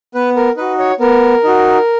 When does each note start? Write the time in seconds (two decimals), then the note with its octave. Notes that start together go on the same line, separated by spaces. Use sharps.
0.15 B3 B4
0.37 A#4
0.57 D#4 F#4 B4
0.79 C#5
1.00 B3 A#4
1.44 D#4 F#4